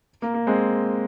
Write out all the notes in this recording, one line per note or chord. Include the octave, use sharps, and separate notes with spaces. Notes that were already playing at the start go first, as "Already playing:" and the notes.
A#3
A#3
G#3 C4